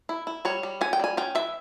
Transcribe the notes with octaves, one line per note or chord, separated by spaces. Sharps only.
E4
E4
G3 C#5
G3
C#4 G#5
G5
G3 G#5
C#4 G5
E3 E5